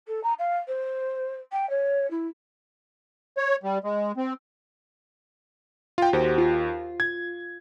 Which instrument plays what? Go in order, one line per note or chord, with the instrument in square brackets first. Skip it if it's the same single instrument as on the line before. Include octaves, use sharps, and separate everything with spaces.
[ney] A4
A#5
F5
C5
G5
C#5
E4
[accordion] C#5
G3
G#3
C4
[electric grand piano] F4 G5
[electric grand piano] D#2 [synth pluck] F#4 G4 C5
[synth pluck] F4
[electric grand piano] G#6